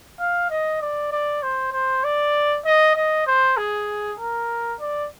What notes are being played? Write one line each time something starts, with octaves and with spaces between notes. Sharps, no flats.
F5
D#5
D5
D5
C5
C5
D5
D#5
D#5
C5
G#4
A#4
D5